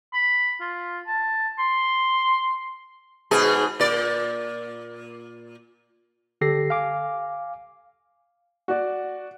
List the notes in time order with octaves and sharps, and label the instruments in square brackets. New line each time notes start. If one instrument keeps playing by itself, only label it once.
[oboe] B5
F4
A5
C6
[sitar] G#2 B2 G#4
A#2 D5
[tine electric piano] G1 D3 G4 A4 A#6 C7
F5 G#5 D6
[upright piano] F#4 D5